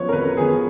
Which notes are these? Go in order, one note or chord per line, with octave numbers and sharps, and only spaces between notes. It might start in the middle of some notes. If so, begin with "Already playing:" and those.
Already playing: F3 B3 C#5
A#4
F2 B4
F3 B3 G#4